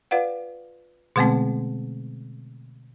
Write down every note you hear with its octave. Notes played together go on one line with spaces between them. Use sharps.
F4 B4 D5 F5 F#5
B2 D3 G#3 A3 B3 C4